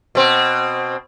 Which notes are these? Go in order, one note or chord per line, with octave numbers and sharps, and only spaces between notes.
B2 C4